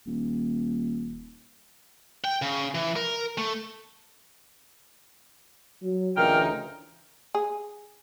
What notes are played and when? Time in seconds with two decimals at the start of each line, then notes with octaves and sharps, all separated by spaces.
0.07 D#1
2.24 G5
2.42 C#3
2.75 E3
2.96 A#4
3.38 A3
5.83 F#3
6.17 D2 A#2 C#3 E3 D#4 G5 F6
7.35 G#4